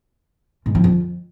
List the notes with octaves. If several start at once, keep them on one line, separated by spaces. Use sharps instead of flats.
G#2
F3
F2